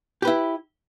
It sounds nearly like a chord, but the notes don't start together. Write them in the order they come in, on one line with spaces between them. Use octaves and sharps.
G4 B4 E4